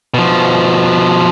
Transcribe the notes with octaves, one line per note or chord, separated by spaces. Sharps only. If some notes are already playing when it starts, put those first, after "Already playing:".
B2 F3